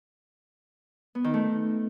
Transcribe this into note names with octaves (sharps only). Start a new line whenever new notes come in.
B3
D#3
A3